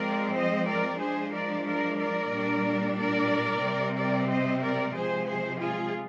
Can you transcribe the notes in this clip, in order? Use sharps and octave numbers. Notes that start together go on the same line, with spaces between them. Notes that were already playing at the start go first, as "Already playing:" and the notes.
Already playing: F3 G#3 C4 A#4 D5
C5 D#5
A#4 D5
F3 G#3 D4 G#4 C5
A#4 D5
A#4 D5
A#4 D5
A#2 G3 D4
A#4 D5
C3 G3 C4
A#4 D5
C5 D#5
A#4 D5
C3 F3 G#3 G#4 C5
G#4 C5
F4 G#4